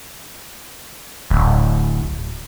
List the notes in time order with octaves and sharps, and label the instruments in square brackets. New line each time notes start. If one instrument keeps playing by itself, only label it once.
[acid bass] D1